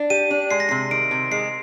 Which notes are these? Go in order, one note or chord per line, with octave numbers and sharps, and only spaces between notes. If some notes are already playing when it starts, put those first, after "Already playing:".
Already playing: D4
G4 D#7
D4
G#3 C7
A#6
C3 C7
D#3 D7
C3
G#3 C7